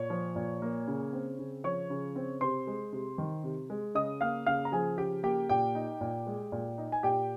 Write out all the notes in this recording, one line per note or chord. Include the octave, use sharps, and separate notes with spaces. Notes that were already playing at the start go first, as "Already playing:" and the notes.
Already playing: A#2 C#5 C#6
F3
A#2
A#3
C#3
C4
C#3
F3 C#5 C#6
C#3
C4
C3 C5 C6
G#3
C3
D#3
C3
G#3
C#3 D#5 D#6
A#3 F5 F6
C#3 F5 F6
A#5
F3 G#4 G#5
C#3 G4 G5
A#3 G4 G5
A#2 G4 G5
D#4
A#2
G#3
A#2
D#4
G#5
A#2 G4 G5